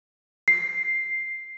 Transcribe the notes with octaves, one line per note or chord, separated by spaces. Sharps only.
C7